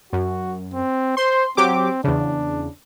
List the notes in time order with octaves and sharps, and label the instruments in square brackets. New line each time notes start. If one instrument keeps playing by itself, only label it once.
[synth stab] F#2 [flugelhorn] F#4
[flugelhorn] C4
[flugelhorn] C5 [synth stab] C6
[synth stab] F#3 G4 D6 [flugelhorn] C4
[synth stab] E2 C#3 [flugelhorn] D4